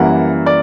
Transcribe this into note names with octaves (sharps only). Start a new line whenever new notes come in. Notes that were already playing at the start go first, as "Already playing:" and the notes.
Already playing: F#2 E3 G3 A#3 F#5
D5